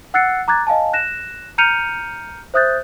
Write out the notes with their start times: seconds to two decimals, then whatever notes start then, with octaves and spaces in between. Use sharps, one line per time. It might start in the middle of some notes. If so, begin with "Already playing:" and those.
0.14 F#5 E6 F#6 A6 C7 C#7
0.48 A#5 D6 F#6 G#6 A6
0.67 D#5 F5 G#5 A5
0.93 F#6 A#6 E7
1.58 A#5 F6 G6 C#7 D#7 F7
2.54 C5 E5 D#6 F#6 G6 A6